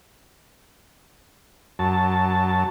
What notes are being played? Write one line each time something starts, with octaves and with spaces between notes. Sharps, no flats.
F#2 A5